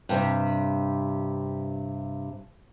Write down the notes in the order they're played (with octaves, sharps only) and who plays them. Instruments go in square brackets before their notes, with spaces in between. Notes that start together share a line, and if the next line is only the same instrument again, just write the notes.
[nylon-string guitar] G2 C3